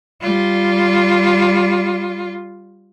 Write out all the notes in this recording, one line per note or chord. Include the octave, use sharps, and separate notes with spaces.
G3 F4